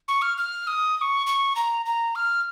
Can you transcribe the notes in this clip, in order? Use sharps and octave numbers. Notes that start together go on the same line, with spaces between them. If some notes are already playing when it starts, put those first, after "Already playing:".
C#6
F6
F6
D#6
D#6
C#6
C#6
A#5
A#5
F6